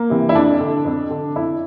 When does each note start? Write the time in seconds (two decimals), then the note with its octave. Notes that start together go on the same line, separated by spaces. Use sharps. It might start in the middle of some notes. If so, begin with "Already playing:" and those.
Already playing: A#3
0.10 C3 E3
0.29 E4
0.34 F2 D4
0.60 D3
0.85 F2
1.10 D3
1.35 F2 E4